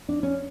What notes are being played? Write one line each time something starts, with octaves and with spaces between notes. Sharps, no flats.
D4
C#4